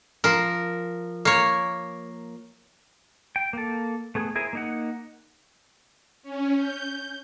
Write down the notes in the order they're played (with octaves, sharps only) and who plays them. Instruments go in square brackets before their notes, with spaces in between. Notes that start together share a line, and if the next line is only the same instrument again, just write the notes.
[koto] F3 A#4
A#3 C#5
[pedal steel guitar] G5
A#3 A4
A3 B3 G#4
E4 G#4 A#4 C5 G#5
A#3 D#4 F#5
[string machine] C#4
G6